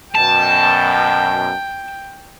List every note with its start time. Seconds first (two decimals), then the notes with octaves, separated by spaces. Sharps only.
0.15 F#2 B2 G5 A5